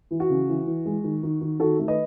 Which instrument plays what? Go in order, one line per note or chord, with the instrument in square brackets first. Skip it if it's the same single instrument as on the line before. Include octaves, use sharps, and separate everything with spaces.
[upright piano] E3
F#4
C#3
E3
E3
G#3
D#3
D#3
D#3
D#3 F#4 A4
A3
B4 D#5